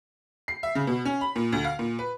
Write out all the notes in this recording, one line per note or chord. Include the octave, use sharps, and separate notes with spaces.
C7
E5
C#3
B2
C#4
B5
A#2
D2
F5
A#2
B4